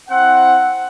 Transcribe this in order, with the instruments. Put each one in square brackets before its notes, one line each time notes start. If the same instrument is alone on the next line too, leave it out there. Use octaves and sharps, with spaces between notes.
[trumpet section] C4 E4 F#5